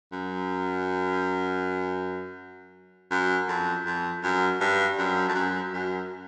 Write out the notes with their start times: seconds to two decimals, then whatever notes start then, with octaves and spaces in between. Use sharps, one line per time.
0.12 F#2
3.11 F#2
3.48 F2
3.85 F2
4.23 F#2
4.61 G2
4.98 F#2
5.29 F2
5.35 F#2
5.73 F#2